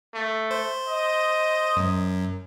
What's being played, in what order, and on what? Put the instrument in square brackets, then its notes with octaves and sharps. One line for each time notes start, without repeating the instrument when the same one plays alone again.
[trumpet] A3
[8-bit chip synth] C5
[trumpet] D#5
[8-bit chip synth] F#2